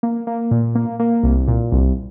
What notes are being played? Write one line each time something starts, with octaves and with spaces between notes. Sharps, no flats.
A#3
A#3
A#2
A#3
A#3
C2
A#2
C2